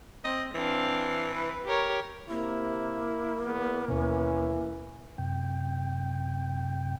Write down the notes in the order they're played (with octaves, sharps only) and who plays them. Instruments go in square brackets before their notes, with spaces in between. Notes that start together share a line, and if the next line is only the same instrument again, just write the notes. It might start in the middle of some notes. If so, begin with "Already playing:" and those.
[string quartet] C4 [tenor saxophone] D#5
[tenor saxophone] E3 [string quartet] C4 D4 F5
[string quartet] B4
G4 A#4 C#5
[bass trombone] C3 [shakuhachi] A#3 [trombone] E4
[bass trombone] E2 [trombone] B3
[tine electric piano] D#2 B2 [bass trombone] E3 [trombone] C#4
[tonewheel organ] F#2 C3 G5